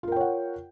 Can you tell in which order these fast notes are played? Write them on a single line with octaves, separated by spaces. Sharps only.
F4 A#4 G5 C#5 F#5